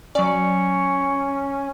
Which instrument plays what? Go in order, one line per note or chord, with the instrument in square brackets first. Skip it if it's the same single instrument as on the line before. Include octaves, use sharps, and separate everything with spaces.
[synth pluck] F#3 D5 [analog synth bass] C#4 [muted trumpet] C#6